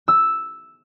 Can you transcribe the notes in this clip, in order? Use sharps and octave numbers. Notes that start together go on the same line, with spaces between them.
E6